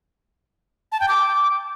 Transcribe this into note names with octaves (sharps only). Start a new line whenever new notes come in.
A5
G5
D6